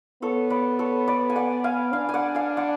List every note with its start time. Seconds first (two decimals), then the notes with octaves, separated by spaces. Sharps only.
0.22 B3 A4 C#5
0.50 B4 D5
0.79 A4 C#5
1.08 B4 D5
1.30 G#5
1.35 D5 F#5
1.64 F5 G#5
1.93 D4 F5 G#5
2.09 G#5
2.14 D5 F#5
2.35 F5 G#5
2.57 D5 F#5